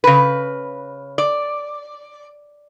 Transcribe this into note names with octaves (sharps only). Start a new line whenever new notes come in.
C#3 B4
D5